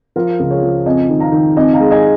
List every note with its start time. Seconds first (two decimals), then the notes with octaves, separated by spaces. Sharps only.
0.16 F3 F4 A#4
0.39 C#2
0.50 G#4 C#5
0.62 F3
0.86 F2 D#5 G#5
1.09 D#3
1.20 F5 A#5
1.32 D#3
1.56 F2 D#5 G#5
1.73 F5 A#5
1.80 G#3
1.91 D#5 G#5